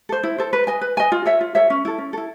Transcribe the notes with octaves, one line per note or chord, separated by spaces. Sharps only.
A4 C5
E4
A4 C5
B4
D#5 G#5
B4
D#5 G#5
F4
A4 C#5 E5
F4
A4 C#5 E5
C#4
E4 A4
C#4
E4 A4